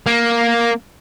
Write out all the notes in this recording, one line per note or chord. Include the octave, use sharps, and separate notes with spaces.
A#3